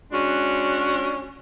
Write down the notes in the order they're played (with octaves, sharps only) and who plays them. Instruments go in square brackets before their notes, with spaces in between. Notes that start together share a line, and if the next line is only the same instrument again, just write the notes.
[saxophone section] G#3 C#4 D4 F#4